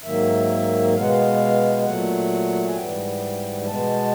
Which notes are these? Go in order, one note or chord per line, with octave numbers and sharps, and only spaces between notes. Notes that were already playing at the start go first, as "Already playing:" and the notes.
G#2 D#3 F#3 A#3 E5
B2 G#3 B3 F5
F#5
F5
A#2 F#3 A3 F#5
G#5
G#2 E3 G3 B3 G5
B2 G#3 B3 A5